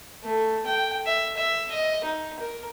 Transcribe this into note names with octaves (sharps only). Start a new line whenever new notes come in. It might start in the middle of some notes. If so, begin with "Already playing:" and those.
A3
G5
E5
E5
D#5
D#4
A#4